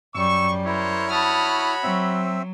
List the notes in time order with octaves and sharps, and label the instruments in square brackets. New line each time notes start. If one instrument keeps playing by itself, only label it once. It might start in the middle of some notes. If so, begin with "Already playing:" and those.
[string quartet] F#2 G3 [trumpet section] C#6 [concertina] E6
[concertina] E4 [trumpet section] A#4 C5 C#5
[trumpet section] F#4 C#5 B5 [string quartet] A5 D#6 F6
[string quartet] F#3 [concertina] C4 E5